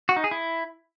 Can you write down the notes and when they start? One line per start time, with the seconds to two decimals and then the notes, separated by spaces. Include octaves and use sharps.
0.09 F#4
0.16 D#4
0.24 G#4
0.31 E4